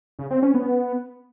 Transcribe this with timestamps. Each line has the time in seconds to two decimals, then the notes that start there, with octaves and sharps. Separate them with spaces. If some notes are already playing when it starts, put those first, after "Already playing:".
0.19 C#3
0.31 C4
0.42 C#4
0.54 B3